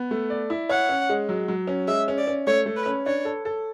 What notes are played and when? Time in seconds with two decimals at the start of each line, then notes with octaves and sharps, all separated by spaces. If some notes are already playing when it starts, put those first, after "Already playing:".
Already playing: B3
0.11 A3
0.30 D5
0.50 E4
0.69 C#5 F#5
0.89 C#4
1.10 G#3
1.29 F#3
1.48 F#3
1.67 C#4
1.88 G#3 E5
2.08 C#4
2.17 D5
2.27 C#4
2.47 A3 C#5
2.66 A3
2.76 B4
2.86 C#4
3.06 D4 C#5
3.25 A4
3.45 A4